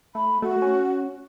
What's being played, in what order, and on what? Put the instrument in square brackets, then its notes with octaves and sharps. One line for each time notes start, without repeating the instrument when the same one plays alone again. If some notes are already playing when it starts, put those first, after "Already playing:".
[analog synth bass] A3 [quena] B5
[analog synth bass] A3 [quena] F#4
[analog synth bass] C#4